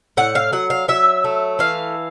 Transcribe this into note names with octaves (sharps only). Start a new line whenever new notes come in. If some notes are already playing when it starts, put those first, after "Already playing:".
A2 F#5
F5
F#3 F#5
F5
F#3 E5
A3
E3 F5